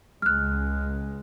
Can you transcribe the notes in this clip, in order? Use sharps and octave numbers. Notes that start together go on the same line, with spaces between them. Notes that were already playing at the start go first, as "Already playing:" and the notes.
C#2 G#3 F6 F#6